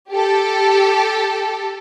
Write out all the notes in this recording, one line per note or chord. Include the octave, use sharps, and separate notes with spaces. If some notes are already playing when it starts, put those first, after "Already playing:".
G4 A4